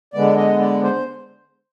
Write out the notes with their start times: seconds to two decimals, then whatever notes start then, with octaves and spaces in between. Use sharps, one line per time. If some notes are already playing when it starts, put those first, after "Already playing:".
0.14 D3 G#3 B3 D5
0.37 D#5
0.60 D5
0.83 C5